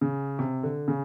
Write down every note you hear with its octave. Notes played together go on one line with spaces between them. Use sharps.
C#3
C3
D3
C#3